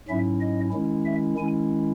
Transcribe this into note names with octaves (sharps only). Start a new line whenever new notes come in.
G#2 F#3 C#4 E4 E5
D#5
D#3 G#3 C#4 E4
E5
D#3 G#3 C#4 E4 G#5